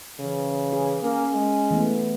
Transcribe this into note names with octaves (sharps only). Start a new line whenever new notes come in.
C#3 E3
G#4
A#3 C#4
G#3
E3 A3 B3